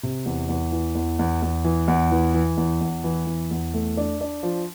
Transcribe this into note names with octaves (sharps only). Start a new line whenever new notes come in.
C3
E2
E2
E3
E2
E2
E2
E3
E2
E3
E3
E2
E2
E3
E2
E2
A3
D4
D4
F3